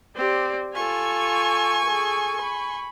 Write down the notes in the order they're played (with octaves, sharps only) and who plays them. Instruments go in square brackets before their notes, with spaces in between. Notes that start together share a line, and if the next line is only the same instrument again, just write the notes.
[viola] C4 [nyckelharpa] G4 D5
[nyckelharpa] F4 A4 [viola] G#5 C#6
[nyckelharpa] G#4 A4
B5